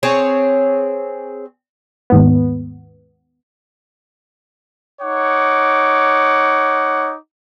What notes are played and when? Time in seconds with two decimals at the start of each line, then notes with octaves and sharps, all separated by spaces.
0.03 C4 G#4 C#5
2.10 D#2 G#2 B3
5.01 D#4 C#5 F#5 D6